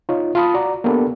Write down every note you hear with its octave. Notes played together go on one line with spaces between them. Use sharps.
D#4 F4 C#5
F4 F5 A5 B5 D#6
F#4 D5 A#5
A#3 B3 D4 G4 A4 B4